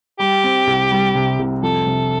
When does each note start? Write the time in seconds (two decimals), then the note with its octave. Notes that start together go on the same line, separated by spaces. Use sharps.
0.19 G3 G4
0.44 C4
0.67 C2
0.91 G3
1.15 C3
1.39 C2
1.62 F2 A4
1.86 C3